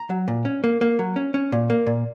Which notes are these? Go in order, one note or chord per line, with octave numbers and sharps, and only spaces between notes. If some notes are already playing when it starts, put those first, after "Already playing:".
Already playing: A#5
F#3
A#2
C#4
A#3
A#3
F#3
C#4
C#4
A#2
A#3
A#2